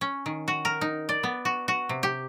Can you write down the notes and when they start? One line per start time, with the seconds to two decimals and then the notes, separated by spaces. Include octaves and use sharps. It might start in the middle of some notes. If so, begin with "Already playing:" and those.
0.01 C#4
0.26 D#3
0.48 F#4
0.65 A#4
0.81 D#4
1.09 D5
1.23 B3
1.45 F#4
1.68 F#4
1.89 C3
2.03 G4